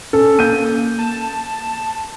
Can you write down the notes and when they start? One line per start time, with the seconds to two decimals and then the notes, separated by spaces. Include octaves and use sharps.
0.13 C#4 A4
0.39 A#3 G6 D#7
0.99 A5